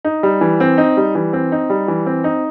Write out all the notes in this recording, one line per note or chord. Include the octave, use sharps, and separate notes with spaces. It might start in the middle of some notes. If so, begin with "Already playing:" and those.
D#4
G3
E3
C4
D#4
G3
E3
C4
D#4
G3
E3
C4
D#4